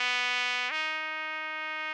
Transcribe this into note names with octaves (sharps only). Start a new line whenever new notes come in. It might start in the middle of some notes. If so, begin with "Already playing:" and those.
Already playing: B3
D#4